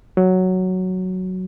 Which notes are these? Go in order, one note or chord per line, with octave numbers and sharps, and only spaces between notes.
F#3